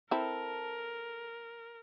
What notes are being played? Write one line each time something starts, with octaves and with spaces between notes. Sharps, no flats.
C4 E4 A4 A#4